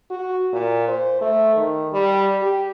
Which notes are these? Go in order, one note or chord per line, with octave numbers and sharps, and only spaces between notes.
F#4
A#2
C5
A3
D#3
G3
G4